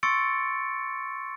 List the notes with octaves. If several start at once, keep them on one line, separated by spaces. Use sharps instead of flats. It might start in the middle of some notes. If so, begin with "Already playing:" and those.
C6 C#6 E6 A6 C#7 D7